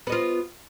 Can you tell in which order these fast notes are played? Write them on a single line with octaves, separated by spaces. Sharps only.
B3 D#5 F4